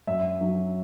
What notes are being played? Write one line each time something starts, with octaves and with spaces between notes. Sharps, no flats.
F#2 E5
F#3